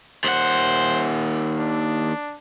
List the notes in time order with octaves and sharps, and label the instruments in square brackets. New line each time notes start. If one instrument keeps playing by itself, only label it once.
[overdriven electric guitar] D#2 F#5 [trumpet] C5
[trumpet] D4